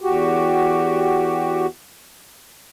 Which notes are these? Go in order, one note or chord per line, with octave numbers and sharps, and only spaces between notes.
E2 F#4 G4